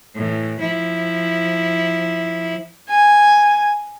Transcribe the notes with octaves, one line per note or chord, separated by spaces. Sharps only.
A2 E3
F3 E4
G#5